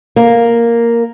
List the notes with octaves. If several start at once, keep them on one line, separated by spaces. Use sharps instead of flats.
A#3